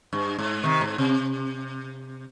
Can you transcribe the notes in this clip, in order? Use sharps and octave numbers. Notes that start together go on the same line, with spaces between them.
G2
G#2
C3 D#3
G#2
C3